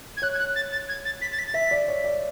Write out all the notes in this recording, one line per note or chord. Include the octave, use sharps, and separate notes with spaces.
G#6
C#5 F#6
G#6
F#6
A6
A6
G#6
A6
B6
A6
B6
A6
E5 B6
D5
C#5
D5